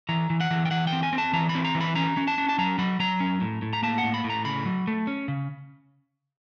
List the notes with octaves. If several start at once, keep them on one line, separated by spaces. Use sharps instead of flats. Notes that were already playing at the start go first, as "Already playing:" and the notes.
E3 A#5
E3
F#5
E3
G5
E3 F#5
G5
C4
G#5
C4
A5
E3 A#5
B5
C4
A#5
E3
B5
C#4 A#5
C#4
A5
C#4
A5
F#3 A#5
F#3 B5
F#3 A#5
C#4
A2
A2
A#5
A#3 A5
F#5
A2
B5
A2
A#5
C#3 B5
F#3
A3
C#4
C#3